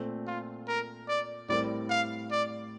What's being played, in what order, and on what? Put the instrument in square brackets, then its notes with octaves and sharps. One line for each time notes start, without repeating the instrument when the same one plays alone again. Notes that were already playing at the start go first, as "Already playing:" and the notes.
Already playing: [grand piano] A#2 A3 C4
[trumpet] F4
A#4
D5
[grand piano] A2 G3 C4 E4 A#4 [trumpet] D5
[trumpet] F5
D5